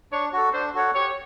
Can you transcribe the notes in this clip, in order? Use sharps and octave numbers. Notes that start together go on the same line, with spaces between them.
D4 C#5
F#4 A4
D4 C5
F#4 A4 C#5 F#5
G4 C#5